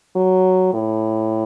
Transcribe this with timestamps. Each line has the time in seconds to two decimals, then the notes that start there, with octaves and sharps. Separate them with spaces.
0.16 F#3
0.74 A2